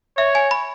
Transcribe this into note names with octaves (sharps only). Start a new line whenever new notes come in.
C#5 E5
G#5
B5